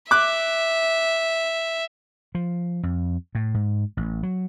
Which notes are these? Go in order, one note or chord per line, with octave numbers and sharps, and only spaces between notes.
E5 D6 F#6
F3
F2
A2
G#2
A1
F#3